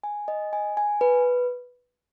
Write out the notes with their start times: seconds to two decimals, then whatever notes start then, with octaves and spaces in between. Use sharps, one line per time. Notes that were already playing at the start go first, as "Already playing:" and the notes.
0.03 G#5
0.28 D#5
0.53 G#5
0.77 G#5
1.01 B4